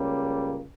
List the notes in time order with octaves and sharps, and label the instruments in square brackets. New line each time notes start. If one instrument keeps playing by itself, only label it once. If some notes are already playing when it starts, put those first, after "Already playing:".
Already playing: [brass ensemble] C#2 C#3 G3 A#3